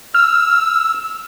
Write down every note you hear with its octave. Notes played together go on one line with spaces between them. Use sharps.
E6 F6